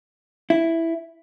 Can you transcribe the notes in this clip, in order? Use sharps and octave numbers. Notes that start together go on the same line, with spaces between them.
E4